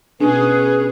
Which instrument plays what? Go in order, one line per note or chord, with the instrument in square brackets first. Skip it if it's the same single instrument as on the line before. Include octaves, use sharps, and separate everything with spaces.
[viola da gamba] B2 C#4 [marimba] D4 [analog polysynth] G#4 [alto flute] B4